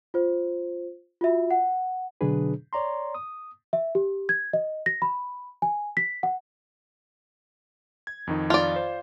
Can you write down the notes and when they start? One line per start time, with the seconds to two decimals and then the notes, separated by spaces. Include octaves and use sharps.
0.14 F4 C5
1.21 F4 F#4 E5
1.51 F#5
2.21 B2 D3 F#3 D4 G#4 B4
2.73 C#5 D5 A#5 C6
3.15 D#6
3.73 E5
3.95 G4
4.29 G#6
4.53 D#5
4.86 A#6
5.02 B5
5.62 G#5
5.97 B6
6.23 F#5
8.07 G#6
8.27 F2 D#3 D#4
8.50 F4 D5
8.76 C5